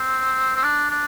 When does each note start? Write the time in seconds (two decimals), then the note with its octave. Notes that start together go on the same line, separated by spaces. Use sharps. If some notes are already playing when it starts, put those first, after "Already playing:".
Already playing: C4
0.56 C4
0.63 D4
0.90 D4